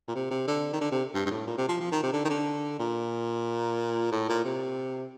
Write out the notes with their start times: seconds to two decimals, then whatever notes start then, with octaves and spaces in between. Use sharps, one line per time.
0.08 A#2
0.15 C3
0.30 C3
0.48 D3
0.73 D#3
0.81 D3
0.91 C3
1.14 G2
1.26 G2
1.30 A2
1.47 A#2
1.58 C3
1.68 F3
1.80 F3
1.91 D#3
2.02 C3
2.13 D3
2.25 D#3
2.29 D3
2.79 A#2
4.11 A2
4.29 A#2
4.44 C3